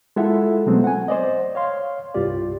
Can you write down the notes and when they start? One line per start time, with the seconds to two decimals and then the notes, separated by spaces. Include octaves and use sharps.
0.16 G#3 E4 F4 A4 E5 F#5
0.66 B2 F#3 G#3 A3 B3 C4
0.84 F#5 G#5
1.08 C5 D5 D#5
1.55 C#5 F5 C6
2.14 C2 G2 F4 G4 D5